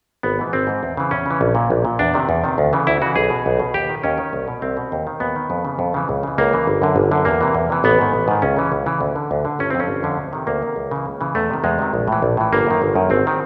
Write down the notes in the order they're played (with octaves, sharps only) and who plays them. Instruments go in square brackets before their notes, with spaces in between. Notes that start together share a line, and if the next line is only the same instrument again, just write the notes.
[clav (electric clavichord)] G#1 B3
G#2 E3
G#1 C4
G#2 E3
E2
C#3 E3
E2 C#4
C#3 E3
A#1
A#2
A#1
A#2
E2 D4
C3 D#3
E2
C3 D#3
D2
C#3 E3
D2 E4
C#3 E3 F#4
B1 G#4
B2
B1
B2
D#2 G4
D#3
D#2 C#4
D#3
C2
B2
C2 C4
B2
D#2
D#3
D#2 B3
D#3
F2
C#3 E3
F2
C#3 E3
C#2
C#3 E3
C#2 A#3
C#3 E3
G1
F#2 D3
G1
F#2 D3
E2 A#3
C3 E3
E2
C3 E3
A1 B3
G#2 D#3
A1
G#2 D#3
C#2 C#4
C#3 E3
C#2
C#3 E3
D2
D3
D2
D3
G1 C#4
F2 D3 C4
C#4
G1
F2 D3
D2
C3 D#3
D2 A#3
C3 D#3
C#2
C#3 E3
C#2
C#3 E3
E2 A3
C3 D#3
E2 G#3
C3 D#3
A#1
A2 E3
A#1
A2 E3
G1 A#3
F#2 D#3
G1
F#2 D#3
G#1 C4
D#3